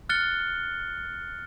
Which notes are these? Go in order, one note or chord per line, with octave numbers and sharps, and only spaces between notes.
F6 F#6 A6 C#7 G7